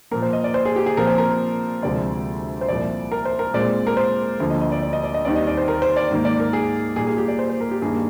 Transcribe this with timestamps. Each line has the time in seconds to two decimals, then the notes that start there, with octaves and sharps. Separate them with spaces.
0.11 A#2 F3 A#3 A#4
0.22 C5
0.33 D#5
0.44 D5
0.54 C5
0.65 G#4
0.76 G4
0.86 G#4
0.97 A#2 F3 C4 A#4
1.07 C5
1.18 A#4
1.82 D2 C3 F3 G#3 D5
2.61 C5
2.68 C2 A#2 F3 D5
3.12 A#4
3.25 C5
3.39 A#4
3.54 A#2 G#3 C4 D5
3.87 A#4
3.97 C5
4.40 D2 D3 F3 A#3
4.50 D#5
4.61 D#5
4.72 D5
4.82 D5
4.93 D#5
5.04 D5
5.14 D#5
5.25 D#2 D#3 G3 C4 D5
5.36 D#5
5.47 D5
5.57 C5
5.68 A#4
5.82 C5
5.96 D5
6.11 G#2 D#3 A#3
6.25 D5
6.40 A#4
6.53 G#4
6.96 A#2 G3 A#3 G#4
7.07 G#4
7.18 G4
7.28 D5
7.39 C5
7.50 C5
7.61 A#4
7.71 G4
7.82 G2 D#3 G3 A#3 G#4